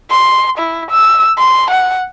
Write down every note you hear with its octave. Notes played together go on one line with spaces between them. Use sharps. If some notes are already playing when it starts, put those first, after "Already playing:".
C6
E4
E6
C6
F#5